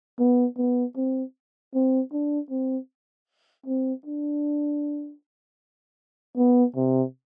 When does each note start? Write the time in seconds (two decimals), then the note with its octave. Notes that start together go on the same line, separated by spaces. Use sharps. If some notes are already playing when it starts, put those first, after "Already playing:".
0.19 B3
0.58 B3
0.96 C4
1.74 C4
2.13 D4
2.50 C4
3.66 C4
4.06 D4
6.37 B3
6.76 C3